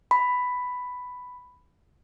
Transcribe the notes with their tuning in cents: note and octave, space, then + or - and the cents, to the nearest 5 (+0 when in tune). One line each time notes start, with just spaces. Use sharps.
B5 +5